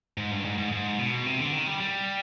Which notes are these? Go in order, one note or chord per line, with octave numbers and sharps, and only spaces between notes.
G#2
G2
G#2
G#2
G#2
B2
C3
D3
D#3
G3
G3